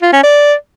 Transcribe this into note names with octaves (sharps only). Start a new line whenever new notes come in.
F4
C#4
D5